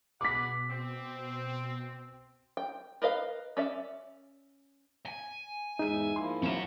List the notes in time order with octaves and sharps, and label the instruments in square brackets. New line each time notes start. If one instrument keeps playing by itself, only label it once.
[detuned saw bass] B2 [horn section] G#4 B4 F#5 [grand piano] D6 B6
[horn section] C4
[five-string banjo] G5
A#4 B4 D#5 F5
C#4 D5 E5
[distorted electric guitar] G#5
[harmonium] E2 G#2 E5 [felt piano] G#3 D#7 [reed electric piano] D#4
[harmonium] F3 A#3 E4 [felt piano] C6
[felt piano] F#2 E7 [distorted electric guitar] C#4 F#4